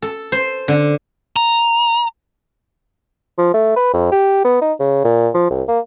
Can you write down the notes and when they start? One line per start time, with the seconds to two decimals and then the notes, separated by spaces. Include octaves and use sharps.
0.02 A4
0.32 C5
0.68 D3
1.36 A#5
3.38 F3
3.54 A3
3.77 B4
3.94 F2
4.12 G4
4.45 B3
4.62 D#4
4.80 C#3
5.05 A#2
5.34 F3
5.51 C2
5.68 A#3